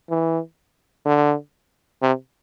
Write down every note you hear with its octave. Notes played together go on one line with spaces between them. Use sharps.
E3
D3
C3